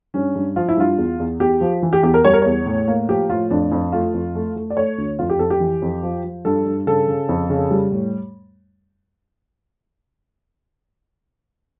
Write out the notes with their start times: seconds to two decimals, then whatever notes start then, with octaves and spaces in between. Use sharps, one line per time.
0.14 G2 C#4
0.35 G2
0.56 F3 F4
0.68 E4
0.77 G2 F4
0.98 E2
1.20 E2
1.40 E2 G4
1.61 F3
1.82 E3
1.93 G4
2.03 E2 G4
2.14 A#4
2.25 G3 C#5
2.33 A#4
2.42 E2 C#5
2.66 A2
2.88 A#3
3.09 F3 G4
3.29 A2 F4
3.50 F2 D4
3.72 F2
3.92 A3 F4
4.14 F2
4.35 A3
4.56 A3
4.70 D5
4.77 A3 C#5
4.98 D2
5.19 F2 F4
5.30 G4
5.39 F2 A4
5.50 G4
5.60 E3
5.82 F2
6.03 F3
6.24 F3
6.45 G2 A4
6.65 G2
6.87 C#3 A4
7.08 C#3
7.29 F2
7.50 C#3
7.71 G3
7.91 A2